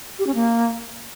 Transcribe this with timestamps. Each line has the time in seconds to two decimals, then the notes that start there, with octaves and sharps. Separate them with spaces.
0.19 G4
0.27 C#4
0.35 A#3